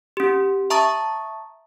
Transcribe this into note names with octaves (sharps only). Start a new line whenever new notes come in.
C#4 G4
E5 A5 A#5 C#6 D#6 A6